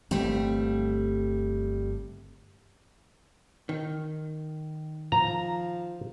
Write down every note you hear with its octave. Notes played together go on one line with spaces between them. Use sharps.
G1 G3 A3 C4
D#3
F3 A#5